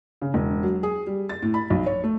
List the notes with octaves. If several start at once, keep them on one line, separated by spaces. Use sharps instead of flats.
C#3
E1
F#3
G#4
G3
A6
A2
B5
B1
C#5
A3